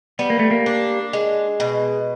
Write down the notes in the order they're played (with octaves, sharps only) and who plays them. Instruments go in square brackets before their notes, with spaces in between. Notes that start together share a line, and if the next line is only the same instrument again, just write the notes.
[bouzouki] G3 [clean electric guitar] B3
[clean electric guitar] A#3
A3
A#3
[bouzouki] D4
G#3
B2